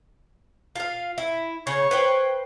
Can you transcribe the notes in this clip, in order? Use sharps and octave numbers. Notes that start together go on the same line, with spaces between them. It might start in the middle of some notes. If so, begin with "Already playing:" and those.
F4 F5
E4
C#3 C#5
B4 C5 G5